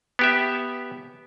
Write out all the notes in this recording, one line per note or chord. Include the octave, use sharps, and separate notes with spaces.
B3 G4 E5